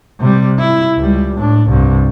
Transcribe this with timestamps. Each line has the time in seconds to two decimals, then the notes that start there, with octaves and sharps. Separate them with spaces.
0.20 C3 G3
0.59 E4
0.96 C#2 G3
1.36 A2 D4
1.68 C2 G2